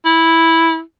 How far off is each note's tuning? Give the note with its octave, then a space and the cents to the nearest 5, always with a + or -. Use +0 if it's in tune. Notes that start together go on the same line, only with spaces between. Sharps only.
E4 -5